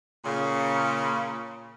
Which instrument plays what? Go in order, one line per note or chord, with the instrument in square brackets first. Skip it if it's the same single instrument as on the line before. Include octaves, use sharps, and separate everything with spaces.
[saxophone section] A#2 C#3